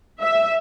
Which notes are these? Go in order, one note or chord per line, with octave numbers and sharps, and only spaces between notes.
E5